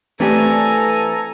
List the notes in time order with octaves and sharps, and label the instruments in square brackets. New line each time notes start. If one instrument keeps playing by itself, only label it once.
[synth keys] E3 A3 [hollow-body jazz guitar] C4 D4 G4 [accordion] A4 A#5 [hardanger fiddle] G#5